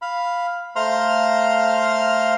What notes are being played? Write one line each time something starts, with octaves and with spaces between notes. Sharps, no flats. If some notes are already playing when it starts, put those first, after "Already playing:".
F5 B5
A3 C5 F5 A#5 C6 F6